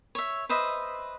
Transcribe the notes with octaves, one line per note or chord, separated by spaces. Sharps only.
C#5 E5
B4 C5 D#5 E5